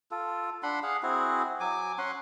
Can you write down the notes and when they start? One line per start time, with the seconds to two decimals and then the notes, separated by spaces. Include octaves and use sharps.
0.11 F4 A4
0.63 D4 F#5 B5 C6
0.83 G#4 F5 F#5
1.03 C4 E4 F#4 G#4
1.60 F#3 G#5 D6
1.98 C#4 F#5 C6